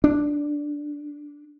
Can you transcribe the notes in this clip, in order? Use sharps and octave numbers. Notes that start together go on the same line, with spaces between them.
D4